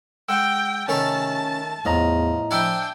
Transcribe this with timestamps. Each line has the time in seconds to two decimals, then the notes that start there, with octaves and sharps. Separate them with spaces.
0.29 G#3 F#5 G5 E6
0.88 C3 D#3 A3 C#4 G#4 A5
1.85 E2 A2 F3 D#5 A#5
2.51 F3 D4 E4 G5 G#5